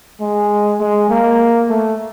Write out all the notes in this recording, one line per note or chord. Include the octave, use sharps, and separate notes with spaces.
G#3
G#3
A#3
A3